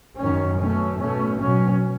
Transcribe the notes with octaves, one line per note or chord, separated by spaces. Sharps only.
F#2 D#3 F#3 C#4
B2 A3 C#4
B2 A3 C#4
B2 F#3 C#4